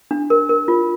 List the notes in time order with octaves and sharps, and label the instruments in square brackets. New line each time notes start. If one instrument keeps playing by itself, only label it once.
[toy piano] D4
A#4
A#4
F4